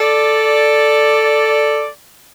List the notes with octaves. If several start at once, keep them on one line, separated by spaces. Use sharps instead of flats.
A4 D5